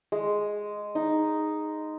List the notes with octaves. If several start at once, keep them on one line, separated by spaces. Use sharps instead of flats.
G#3
D#4